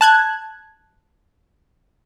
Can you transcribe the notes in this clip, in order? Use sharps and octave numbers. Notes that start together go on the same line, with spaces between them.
A5 F#6 G#6